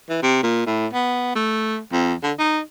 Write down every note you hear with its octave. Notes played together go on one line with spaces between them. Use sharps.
E3
C3
A#2
A2
B3
A3
F2
D3
D#4